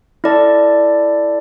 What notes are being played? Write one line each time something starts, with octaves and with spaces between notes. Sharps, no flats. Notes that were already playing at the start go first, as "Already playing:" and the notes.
E4 A4 D5 A5